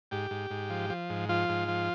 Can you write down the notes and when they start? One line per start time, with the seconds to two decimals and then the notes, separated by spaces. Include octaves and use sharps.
0.11 G#2 G4
0.31 G#2
0.50 G#2
0.70 F3
0.90 F3
1.10 G#2
1.29 F3 F4
1.49 G#2
1.68 F3